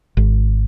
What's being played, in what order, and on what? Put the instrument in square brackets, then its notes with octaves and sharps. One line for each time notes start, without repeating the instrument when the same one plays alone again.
[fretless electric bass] G#1